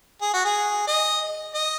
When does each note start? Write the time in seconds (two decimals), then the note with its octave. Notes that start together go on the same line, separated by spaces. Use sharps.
0.21 G#4
0.33 F#4
0.45 G#4
0.87 D#5
1.54 D#5